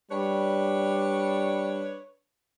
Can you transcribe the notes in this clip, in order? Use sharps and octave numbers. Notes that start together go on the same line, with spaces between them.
G3 D4 B4 C#5